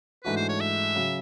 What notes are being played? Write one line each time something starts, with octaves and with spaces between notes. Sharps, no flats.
G#2 E3 A3 D4 F#4 B4
C5
C#5
E5
C#3 F#3